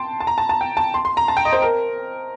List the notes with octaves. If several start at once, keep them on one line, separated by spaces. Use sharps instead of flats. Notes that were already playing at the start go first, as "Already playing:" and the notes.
Already playing: G5 A5 C6
A5
A#5
A5
A5
G5
A5
C6
C6
A#5
A5
G5
D#5
C5
A#4